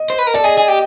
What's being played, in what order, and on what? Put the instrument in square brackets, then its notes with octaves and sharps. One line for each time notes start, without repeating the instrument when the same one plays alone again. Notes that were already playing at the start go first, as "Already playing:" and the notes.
Already playing: [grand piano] D#5
[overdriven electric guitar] C5
B4
A#4
[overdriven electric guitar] A4 [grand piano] D5
[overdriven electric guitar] G#4 [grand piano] D#5
[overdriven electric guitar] G#4
G4